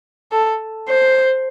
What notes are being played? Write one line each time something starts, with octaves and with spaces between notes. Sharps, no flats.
A4
C5